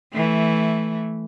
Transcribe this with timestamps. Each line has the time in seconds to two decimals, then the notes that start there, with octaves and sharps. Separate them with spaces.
0.12 E3 A3